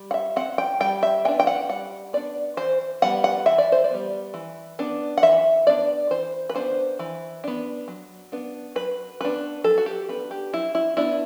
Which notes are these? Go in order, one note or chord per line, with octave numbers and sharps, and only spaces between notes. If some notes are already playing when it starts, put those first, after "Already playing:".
Already playing: G3
F#5
E5
C4 F#5
G5
G3 G5
E5
B3 D4 G5
G5
F#5
G3 F#5
B3 D4 D5
E3 C5
G3 B3 F#5
F#5
E3 E5
D5
C5
D5
G3 B3
E3
B3 D4
F#5
E3 E5
B3 D4 D5
E3 C5
B4
B3 D4 C5
E3
B3 D4
F#3
B3 D4
F#3 B4
B3 D4 B4
F#3 A4
F#4
G4
B3 D4 B4
G4
F#3 E4
E4
B3 D4 E4